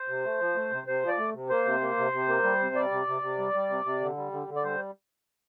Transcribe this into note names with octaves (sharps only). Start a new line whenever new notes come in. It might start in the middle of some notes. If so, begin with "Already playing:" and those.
Already playing: C5
C3
A3
F3
A3
C3
C3 C5
F3
D5
A3
C3
A#3 C5
C3
A#3
C3
C3
A#3
G3
C3
G3 D5
C3
C3
C3
G3
G3
C3
C3
D3
G3
D3
D3
D5
G3 C5